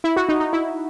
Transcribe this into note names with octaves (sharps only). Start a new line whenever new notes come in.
E4
F#4
D#4
D#4
E4